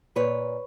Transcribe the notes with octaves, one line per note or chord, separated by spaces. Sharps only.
A#2 B4 C#5